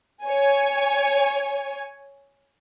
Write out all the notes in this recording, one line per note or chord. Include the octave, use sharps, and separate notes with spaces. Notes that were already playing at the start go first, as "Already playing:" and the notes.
C#5 G#5